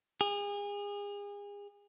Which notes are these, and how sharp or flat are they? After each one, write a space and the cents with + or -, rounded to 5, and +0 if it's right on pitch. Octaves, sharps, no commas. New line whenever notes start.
G#4 -35